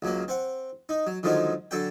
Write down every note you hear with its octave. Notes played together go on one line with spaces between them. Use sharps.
C#2 F#3 A#3
C4 F#5
D#4
F#3
D3 D#3 F3 F#3 G#3 D#4
D3 F#3 A4 G5